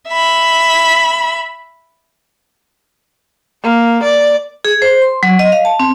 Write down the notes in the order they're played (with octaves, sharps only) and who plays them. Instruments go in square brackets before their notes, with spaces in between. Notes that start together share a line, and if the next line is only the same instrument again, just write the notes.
[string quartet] E5 B5
[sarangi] A#3
D5
[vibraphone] G#4
C5
C6
F#3
D#5
F5
A5
C4